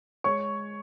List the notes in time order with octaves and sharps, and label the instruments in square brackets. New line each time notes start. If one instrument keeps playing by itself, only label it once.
[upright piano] G#3 C#5 C#6